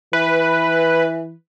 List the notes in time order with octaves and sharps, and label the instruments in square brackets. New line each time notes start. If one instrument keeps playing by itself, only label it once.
[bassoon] E3 [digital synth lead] B4